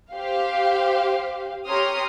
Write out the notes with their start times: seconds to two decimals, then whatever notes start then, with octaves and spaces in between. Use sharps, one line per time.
0.12 G4 C5 F5
1.67 G4 C#5 A#5 C6 D#6 F6